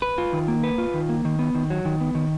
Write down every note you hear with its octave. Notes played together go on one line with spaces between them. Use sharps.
B4
F4
D#3
A#3
B4
F4
D#3
A#3
D#3
B3
D#3
F#3
D#3
B3
D#3